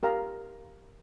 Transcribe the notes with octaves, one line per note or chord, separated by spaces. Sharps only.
G4 A#4 F5 A#5